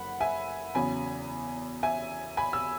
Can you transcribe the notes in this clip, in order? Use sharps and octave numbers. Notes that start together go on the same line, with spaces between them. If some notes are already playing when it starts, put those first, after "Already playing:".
Already playing: F#1 F#5 B5
E5 G#5
E2 C#3 F#3 G#5 B5
E5 G#5
G#5 B5
E6